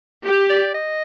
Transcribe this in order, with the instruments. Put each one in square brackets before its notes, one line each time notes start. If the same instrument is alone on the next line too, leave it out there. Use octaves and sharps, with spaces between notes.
[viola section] G4
[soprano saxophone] D5
D#5